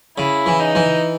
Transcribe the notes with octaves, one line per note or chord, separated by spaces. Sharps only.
C#3 E4
E3
D#4
E3